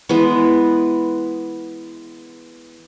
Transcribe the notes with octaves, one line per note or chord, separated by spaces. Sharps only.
E3 G#3 B3